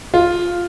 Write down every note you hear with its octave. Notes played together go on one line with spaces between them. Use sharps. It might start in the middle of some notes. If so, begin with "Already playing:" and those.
F4